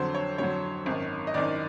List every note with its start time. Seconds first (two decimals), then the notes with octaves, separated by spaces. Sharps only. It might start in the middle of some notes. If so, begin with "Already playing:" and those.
Already playing: F2 D3 F#3 C5
0.14 C#5
0.38 F2 D3 F#3 C#5
0.86 G#1 F#2 D#3
1.27 D#5
1.34 G#1 F#2 D#3 D5